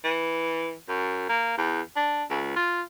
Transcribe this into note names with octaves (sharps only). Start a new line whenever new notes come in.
E3
F#2
A#3
E2
D4
C#2
F4